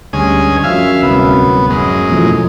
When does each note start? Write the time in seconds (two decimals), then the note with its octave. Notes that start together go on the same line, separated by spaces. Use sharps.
0.13 D2 G2 G#3 C#4 G#5
0.64 F#2 F3 E5 F5
1.03 D1 C2 B3
1.70 F#2 G#3
2.10 B2 E3 F3 A3